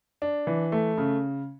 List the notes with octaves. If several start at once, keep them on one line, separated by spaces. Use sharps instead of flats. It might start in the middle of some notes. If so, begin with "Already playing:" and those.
D4
E3
A3
C#3